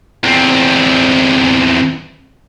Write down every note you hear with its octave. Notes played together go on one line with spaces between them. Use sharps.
E2 C4